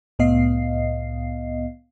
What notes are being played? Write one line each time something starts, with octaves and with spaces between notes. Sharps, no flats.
C2 A2 B3 D#5 F5 C7